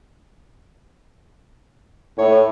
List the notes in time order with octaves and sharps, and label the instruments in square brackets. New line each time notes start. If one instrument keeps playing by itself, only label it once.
[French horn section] A2 [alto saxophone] C#5